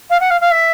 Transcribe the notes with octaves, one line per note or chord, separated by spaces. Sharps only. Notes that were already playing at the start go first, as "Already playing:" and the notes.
F5
F#5
F5
F5
E5